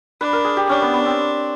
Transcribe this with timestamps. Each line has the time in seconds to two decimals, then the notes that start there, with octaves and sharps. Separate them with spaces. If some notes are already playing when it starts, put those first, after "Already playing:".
0.21 D4 B4
0.33 A#4
0.44 G#4
0.57 G4
0.69 C#4 D4
0.82 B3
0.94 B3
1.06 C4